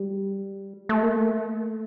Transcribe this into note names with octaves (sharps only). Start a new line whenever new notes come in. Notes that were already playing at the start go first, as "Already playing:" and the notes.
Already playing: G3
A3
A#3
A3